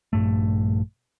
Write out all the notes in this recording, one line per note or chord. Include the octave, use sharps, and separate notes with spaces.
A#1 G2 A3